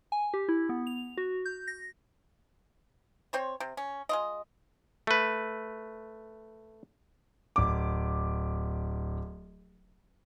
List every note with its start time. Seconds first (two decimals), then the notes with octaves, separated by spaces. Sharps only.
0.12 G#5
0.34 G4
0.49 E4
0.69 B3
0.87 F7
1.17 F#4
1.45 G6
1.67 A#6
3.33 C4 C5 C#5
3.60 C3
3.77 C#4
4.09 G#3 F4 D#5
5.07 A3 B4
7.56 D1 D6